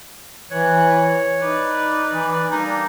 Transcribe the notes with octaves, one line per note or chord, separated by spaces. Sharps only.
E3 C#5 F#6
D#4 B4 D5
E3
G3 A#3 D4 D#4